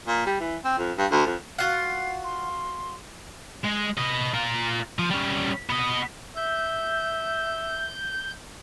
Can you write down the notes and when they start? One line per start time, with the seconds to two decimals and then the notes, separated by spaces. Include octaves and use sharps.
0.07 A#2
0.26 G3
0.40 E3
0.64 C4
0.78 F2
0.98 G2
1.11 D2
1.26 F2
1.59 F4 F#4 F5 F#5 C7
2.24 C6
3.64 G#3
3.98 B4 D#5
4.34 F4 A#4
4.99 F3
5.10 G3 C#4
5.69 B3 D#5
6.37 E5 G6